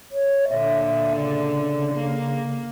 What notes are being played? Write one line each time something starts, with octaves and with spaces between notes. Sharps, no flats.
C#5
A#2 D3 E5
C#3
A#3